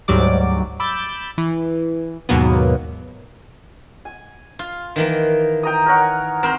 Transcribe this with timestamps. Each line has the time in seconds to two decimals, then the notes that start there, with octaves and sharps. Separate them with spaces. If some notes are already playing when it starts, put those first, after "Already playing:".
0.08 D2 G#2 F#3 G3 D5 D6
0.80 B5 D6 E6 G6 A6
1.38 E3
2.29 D#2 G#2 B2 F#3 A#3 B3
4.05 G#5
4.59 F4
4.96 D#3 E3 A#3
5.63 G5 A#5 D#6
5.86 A#4 C#5 F#5
6.43 C4 A#4 C5